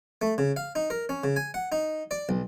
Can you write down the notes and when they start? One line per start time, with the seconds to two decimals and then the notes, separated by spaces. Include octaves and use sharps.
0.22 A3
0.38 C#3
0.56 F5
0.75 D#4
0.90 A#4
1.09 C#4
1.24 C#3
1.36 G#5
1.54 F#5
1.72 D#4
2.11 D5
2.29 B1